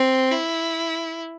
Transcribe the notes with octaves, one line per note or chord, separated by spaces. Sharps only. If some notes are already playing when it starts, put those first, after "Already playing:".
Already playing: C4
E4